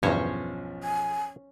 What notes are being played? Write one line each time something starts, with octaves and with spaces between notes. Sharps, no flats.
B1 E2 G2 F3 C#4 C5 C#5
G#5